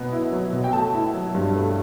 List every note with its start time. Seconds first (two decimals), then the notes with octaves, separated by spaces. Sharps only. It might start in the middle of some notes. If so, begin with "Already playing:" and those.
Already playing: B2 F#3 B3
0.12 E4
0.32 F#3
0.53 B2
0.64 G5
0.73 A3 A5
0.94 E4
1.14 F#3
1.35 G2
1.55 A3